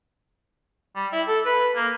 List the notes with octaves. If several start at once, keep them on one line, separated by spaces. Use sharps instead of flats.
G3
E4
A4
B4
A#3